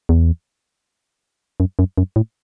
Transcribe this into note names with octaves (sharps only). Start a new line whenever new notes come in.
E2
F#2
F#2
F#2
A2